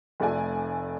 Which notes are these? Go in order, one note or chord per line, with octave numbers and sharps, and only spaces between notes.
F1 A3 D5 G#5